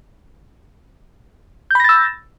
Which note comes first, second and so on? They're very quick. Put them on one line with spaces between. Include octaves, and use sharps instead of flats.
G6 B5 A#6 A6 E6